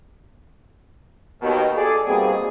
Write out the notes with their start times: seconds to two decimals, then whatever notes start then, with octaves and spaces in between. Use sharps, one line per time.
1.42 D#2 B2 D#3
1.77 G#4 A4 D5
2.06 B2 G3 A#3 C4 D#4 G#4